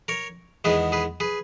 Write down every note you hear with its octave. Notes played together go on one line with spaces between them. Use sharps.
A#4 C#5
E2 D#3 G#3 B3 G#4 B4
G#4 B4
G#4 B4